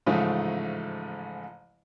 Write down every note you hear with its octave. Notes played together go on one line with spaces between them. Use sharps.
A1 G#2 C#3 F3 A3